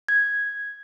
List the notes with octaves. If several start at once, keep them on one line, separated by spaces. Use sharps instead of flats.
G#6